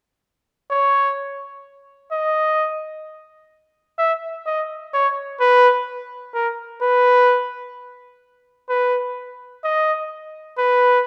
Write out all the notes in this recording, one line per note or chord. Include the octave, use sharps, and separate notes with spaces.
C#5
D#5
E5
D#5
C#5
B4
A#4
B4
B4
D#5
B4